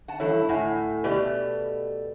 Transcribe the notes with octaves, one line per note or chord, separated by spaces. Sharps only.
F#5 A5
G2 E3 E4 A4 C#5
D2 A2 F#5 G#5
B2 A3 G4 B4 D5